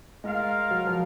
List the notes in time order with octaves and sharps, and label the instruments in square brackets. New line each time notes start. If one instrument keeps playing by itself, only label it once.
[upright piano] G#3 [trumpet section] F4 A#4 F5
[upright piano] F#3
F3